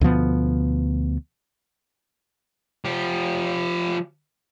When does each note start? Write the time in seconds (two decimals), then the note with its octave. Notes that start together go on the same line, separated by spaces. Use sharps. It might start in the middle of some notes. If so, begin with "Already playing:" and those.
0.01 D2 B2 F3 B3
2.85 F3 G4